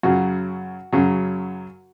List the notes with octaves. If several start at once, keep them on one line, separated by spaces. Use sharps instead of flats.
F#2 C#3 F#3 F#4
F#2 C#3 F#3